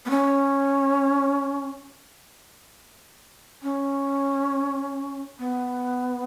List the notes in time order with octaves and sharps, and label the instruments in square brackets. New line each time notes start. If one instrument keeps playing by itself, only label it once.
[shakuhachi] B3
C#4
C#4
B3